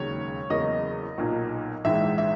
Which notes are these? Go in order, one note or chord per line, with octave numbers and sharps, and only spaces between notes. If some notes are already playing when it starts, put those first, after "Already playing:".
Already playing: E1 D#2 C#3 F#3 C#5
E2 C#3 F#3 A#3 D#5
B1 A#2 F#3
A#1 G#2 E3 G#3 E5
E5